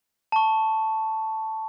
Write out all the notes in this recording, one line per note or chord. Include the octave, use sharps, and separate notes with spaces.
A5 C#6